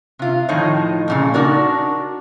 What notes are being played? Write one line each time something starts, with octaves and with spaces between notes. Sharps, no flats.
C3 F4
A2 D#3 F3 D#4 C#5 D#5
F2 A#2 C#3
D4 D#4 F#4 A#4 D5